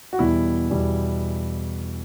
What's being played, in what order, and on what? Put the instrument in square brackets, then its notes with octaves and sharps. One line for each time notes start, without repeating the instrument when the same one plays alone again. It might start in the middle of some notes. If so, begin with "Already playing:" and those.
[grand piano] F#4
E2 B2 G3 E4
E2 B2 G3